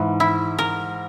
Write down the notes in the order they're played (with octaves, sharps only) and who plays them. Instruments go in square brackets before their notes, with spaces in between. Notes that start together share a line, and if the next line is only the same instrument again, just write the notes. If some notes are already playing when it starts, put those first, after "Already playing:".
Already playing: [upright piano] G#2 [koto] E3
[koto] E4
A#4